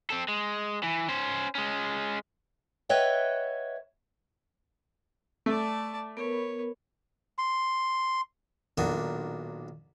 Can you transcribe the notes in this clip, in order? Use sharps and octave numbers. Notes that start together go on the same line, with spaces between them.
C4 A4
G#3
E3
C#4 C5
G#3 C#4
B4 C#5 D#5 E5 F#5 G5
A3 D5 A5
B3 A#4 B4 C#5
C6
B1 A#2 D#3 D4 F#4 D#6